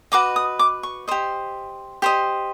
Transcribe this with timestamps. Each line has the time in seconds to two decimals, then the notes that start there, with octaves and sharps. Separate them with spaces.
0.12 F#4 B4 D#5 D6
0.36 D#6
0.59 D6
0.83 C#6
1.08 G4 C5 D#5
2.02 G4 C5 D#5